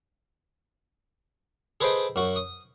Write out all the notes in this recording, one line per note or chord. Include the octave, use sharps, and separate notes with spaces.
G#4 A4 B4 C5 D#5 G5
F#2 F#4
D#6